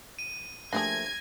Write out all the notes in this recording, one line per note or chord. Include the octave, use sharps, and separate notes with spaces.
D#7
F3 A3 A#3 D4 G4 G#4 G#6 A#6